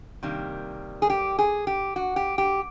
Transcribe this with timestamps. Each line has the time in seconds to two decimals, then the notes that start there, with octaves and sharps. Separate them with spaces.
0.23 C3 D#3 G3 A#3
1.02 G#4
1.10 G4
1.39 G#4
1.67 G4
1.96 F#4
2.16 G4
2.38 G4